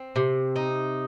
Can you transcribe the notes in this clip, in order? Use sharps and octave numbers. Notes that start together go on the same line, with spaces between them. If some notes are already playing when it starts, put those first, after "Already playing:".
Already playing: C4
C3
D#4